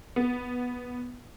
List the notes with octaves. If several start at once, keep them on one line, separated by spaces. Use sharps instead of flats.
B3